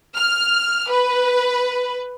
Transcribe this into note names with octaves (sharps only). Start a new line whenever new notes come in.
F6
B4